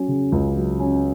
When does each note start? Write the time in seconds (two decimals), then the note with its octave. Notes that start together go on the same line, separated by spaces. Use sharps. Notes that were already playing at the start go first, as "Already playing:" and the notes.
Already playing: F#3 C#4
0.08 C#3
0.32 C#2
0.56 F#3
0.80 C#4